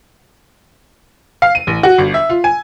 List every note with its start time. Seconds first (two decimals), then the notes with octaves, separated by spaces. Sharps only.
1.42 F5
1.55 D#7
1.67 A1
1.83 F#4
1.98 G1
2.14 E5
2.29 F4
2.44 G#5